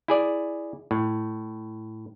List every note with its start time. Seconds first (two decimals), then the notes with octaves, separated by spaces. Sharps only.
0.08 E4 G#4 D5
0.91 A2